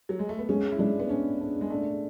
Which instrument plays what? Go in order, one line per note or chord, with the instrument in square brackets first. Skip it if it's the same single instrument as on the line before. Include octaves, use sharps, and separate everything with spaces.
[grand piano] F#3
G#3
A3
B3
[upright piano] G#3 [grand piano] C#4
[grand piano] E4
[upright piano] G#3 [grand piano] D4
[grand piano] B3
[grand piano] C#4 [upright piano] D4
[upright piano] D4
[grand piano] G#3
[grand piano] A3 [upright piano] D4